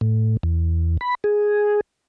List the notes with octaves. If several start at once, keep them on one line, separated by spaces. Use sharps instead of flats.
A2
E2
B5
G#4